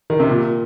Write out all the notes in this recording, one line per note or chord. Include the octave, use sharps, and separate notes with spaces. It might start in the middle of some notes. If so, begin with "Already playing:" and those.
D#3
C3
A#2